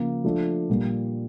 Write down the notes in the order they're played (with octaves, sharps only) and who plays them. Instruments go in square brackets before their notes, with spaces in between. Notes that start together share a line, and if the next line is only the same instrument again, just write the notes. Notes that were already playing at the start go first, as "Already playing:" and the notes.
Already playing: [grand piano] C#3 F3 A#3
F3 A3 D4 F4
A#2 G3 A#3